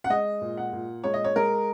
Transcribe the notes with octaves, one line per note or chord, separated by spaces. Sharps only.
F#5
G#3 D#5
A#2
F#5
A#2
G#3 C#5
D#5
C#5
G#3 A#4